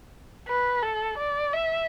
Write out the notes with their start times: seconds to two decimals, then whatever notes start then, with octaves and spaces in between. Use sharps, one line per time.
0.48 B4
0.83 A4
1.18 D5
1.53 E5